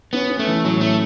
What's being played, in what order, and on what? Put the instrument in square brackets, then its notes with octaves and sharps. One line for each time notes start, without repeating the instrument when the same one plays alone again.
[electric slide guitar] B3 [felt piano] C#4
[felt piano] C#4
[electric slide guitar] A3
[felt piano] E3
[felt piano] A2 [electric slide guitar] F#3
[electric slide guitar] A3 [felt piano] C#4